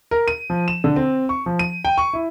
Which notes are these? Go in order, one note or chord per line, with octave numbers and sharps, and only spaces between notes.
A#4
D#7
F3
E7
D3
C4
C#6
F3
D#7
G5
C#6
E4